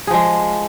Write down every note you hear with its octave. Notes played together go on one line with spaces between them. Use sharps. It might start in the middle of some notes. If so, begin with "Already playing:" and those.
F3 G#3 G#4